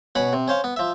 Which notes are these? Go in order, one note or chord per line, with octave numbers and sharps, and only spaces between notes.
B2 C#4 F#5 B5
C3
C#4 C5 F5
B3
F3 E5